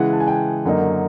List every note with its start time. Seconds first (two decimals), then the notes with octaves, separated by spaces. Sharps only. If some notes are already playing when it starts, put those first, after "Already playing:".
Already playing: C#3 E3 G#3 F#5
0.13 A5
0.20 G#5
0.28 G5
0.65 F#2 D3 F#3 A#3 D#4